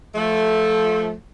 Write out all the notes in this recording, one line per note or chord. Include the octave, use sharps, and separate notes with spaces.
F3 A3